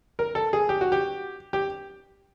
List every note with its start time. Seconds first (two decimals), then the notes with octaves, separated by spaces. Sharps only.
0.19 A#4
0.35 A4
0.53 G#4
0.69 G4
0.81 F#4
0.92 G4
1.53 G4